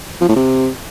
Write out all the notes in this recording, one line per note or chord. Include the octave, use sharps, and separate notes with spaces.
F3
A2
C3